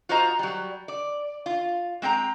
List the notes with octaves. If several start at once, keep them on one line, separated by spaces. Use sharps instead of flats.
F4 F#4 C5 D#5 A#5
F#3 G3
D5
F4
G#3 C4 G5 A#5